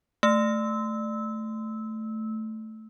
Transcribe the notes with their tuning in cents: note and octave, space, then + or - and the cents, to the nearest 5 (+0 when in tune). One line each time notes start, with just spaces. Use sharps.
A3 +0 E6 -20